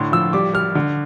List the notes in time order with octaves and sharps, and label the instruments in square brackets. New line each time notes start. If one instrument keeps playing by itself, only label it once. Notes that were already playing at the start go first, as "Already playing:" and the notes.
Already playing: [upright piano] A2 D3 C6
F3 E6
G3 D6
G3 F6
D3